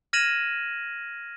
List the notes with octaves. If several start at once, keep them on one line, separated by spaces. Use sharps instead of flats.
F6 G#6 A#6 D#7 E7 F#7